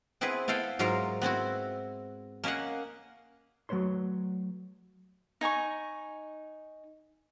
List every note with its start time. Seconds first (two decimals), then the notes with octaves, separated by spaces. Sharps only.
0.21 B3 C4 E4 G#4 B4
0.48 B3 E4 A4 F5 G5
0.79 G#2 F#3 F4 A#4 C5 F5
1.22 B3 C4 E4 F#4
2.44 A#3 C#4 D#5 F5 F#5
3.69 F#3 A3 B4 C#5 C6
5.41 D#4 G#5 A#5 C#6